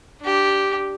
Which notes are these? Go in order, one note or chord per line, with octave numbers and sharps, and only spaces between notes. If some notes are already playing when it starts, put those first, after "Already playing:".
D4 G4